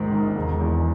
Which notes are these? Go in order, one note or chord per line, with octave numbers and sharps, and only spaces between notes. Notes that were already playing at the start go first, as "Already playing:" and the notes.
Already playing: A#1 G#2 D#3
D#3
E1
E2